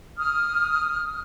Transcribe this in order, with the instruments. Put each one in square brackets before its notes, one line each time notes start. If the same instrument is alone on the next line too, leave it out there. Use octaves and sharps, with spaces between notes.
[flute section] D#6 F6